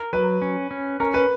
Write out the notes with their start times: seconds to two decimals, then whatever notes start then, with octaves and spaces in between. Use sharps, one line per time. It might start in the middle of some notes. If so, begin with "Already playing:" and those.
Already playing: A#4
0.13 F#3 B4
0.42 C#4
0.71 C#4
1.00 C#4 A#4
1.14 B4